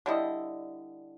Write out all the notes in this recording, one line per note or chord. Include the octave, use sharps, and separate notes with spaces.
D3 G3 E4 D#5